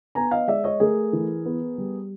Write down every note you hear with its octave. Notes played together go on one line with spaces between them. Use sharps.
B3 G#5 A#5
D#5 F5
G#3 D5 E5
C#5 D#5
A3 G#4 A#4
E3
B3
G3